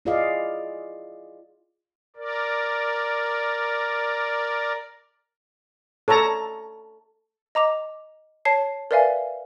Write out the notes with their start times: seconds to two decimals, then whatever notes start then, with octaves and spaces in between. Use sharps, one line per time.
0.05 E4 F4 G#4 D5 D#5 F5
2.17 A#4 D5
6.08 A4 C#5 A5 A#5
7.55 D#5 A#5 D6 F7
8.45 C#5 A5 C7
8.91 A#4 B4 D5 E5 F5 G#5